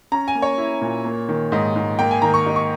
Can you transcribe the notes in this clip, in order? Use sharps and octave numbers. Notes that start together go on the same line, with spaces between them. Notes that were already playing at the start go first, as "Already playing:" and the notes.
C#4 A#5
G#5
A#3
C#5
E4
A#2
A#3
D#3
G#2 D#5
G#2
A#3 G5
G#5
D#3 A#5
C#6
D#4
C#6